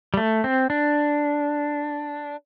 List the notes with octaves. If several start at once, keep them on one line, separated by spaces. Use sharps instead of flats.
G3
A3
C4
D4